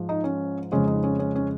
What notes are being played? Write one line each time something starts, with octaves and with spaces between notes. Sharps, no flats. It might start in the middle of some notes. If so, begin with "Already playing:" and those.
Already playing: G#2 F3 G#3
D#4
C#4
F2 C#3 G#3 C#4
D#4
C#4
C#4
C#4